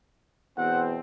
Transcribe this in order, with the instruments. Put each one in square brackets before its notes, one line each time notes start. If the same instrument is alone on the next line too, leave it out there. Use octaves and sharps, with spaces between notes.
[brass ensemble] E2 B2 C4 [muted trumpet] F#5